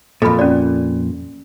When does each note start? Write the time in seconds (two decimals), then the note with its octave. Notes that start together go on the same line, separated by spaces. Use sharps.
0.22 F2 A#2 A4 B4 B5
0.39 C#4 D5